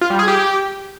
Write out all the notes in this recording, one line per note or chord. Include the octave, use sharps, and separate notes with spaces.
F4
G3
G#4
G4